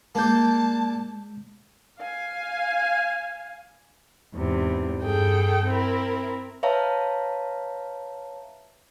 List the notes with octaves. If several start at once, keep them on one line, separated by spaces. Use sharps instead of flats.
G#3 A#3 D4 A5 G6
F5 G#5
E2 G#2 C3
G2 G#4 A4 G5
C4 E4 A#4
B4 C#5 E5 F5 A5 A#5